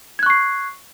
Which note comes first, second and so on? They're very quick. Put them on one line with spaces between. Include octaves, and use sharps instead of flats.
G#6 F#6 C#6 C7